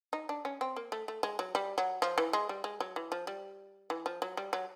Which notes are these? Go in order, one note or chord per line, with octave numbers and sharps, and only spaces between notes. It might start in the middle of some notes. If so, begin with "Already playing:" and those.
D#4
D4
C#4
C4
A#3
A3
A3
G#3
F#3
G3
F#3
F3
E3
G#3
G3
G#3
F#3
E3
F3
G3
E3
F3
F#3
G3
F#3